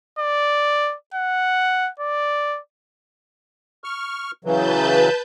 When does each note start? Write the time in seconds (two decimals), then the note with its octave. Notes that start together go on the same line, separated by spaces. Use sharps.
0.19 D5
1.14 F#5
1.99 D5
3.84 C#6 F6
4.45 C#3 E3 F#3 B4 A5 G6